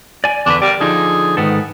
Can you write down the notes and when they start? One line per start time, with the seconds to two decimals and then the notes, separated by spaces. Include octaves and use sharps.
0.24 D5 G#5
0.46 E2 D3 D4 B4
0.62 G3 A#4 D5
0.81 D3 F3 D#4 G#4
1.37 G#2 D#3 B3 A4